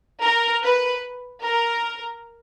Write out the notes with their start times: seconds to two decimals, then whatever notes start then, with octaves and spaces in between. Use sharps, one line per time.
0.23 A#4
0.63 B4
1.43 A#4